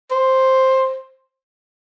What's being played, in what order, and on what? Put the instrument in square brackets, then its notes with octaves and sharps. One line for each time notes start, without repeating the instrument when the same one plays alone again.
[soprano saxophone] C5